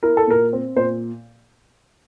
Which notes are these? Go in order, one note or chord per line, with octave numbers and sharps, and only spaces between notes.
E4 A#4
A4
A#2 A#4
C4
A#2 C5